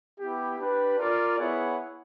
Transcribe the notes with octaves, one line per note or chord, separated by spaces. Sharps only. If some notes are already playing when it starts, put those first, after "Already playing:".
B3 E4 G4
D4 G4 B4
F4 A#4 D5
B3 E4 G#4 C#5 F#5